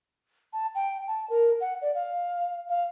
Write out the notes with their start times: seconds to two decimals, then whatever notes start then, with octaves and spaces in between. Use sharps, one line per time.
0.53 A5
0.75 G5
1.08 A5
1.30 A#4
1.60 F#5
1.82 D5
1.95 F5
2.69 F5